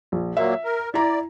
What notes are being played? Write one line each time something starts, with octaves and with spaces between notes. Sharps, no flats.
A#1
A#2 F#3 A#3 E5
A#4
E4 D5 A#5